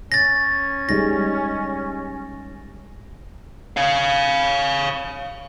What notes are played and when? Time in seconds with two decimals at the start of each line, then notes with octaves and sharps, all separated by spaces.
0.12 C#4 A6 A#6
0.89 G3 G#3 D#4 A#6
3.77 C#5 F5